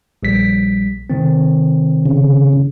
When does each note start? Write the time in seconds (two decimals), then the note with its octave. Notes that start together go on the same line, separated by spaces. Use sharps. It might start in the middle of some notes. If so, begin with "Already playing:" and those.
0.23 A#1 G3 B6
1.10 C3 D#3 C4
2.06 C#3